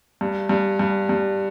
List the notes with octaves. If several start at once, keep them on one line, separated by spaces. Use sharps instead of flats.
G2
G2
G2
G2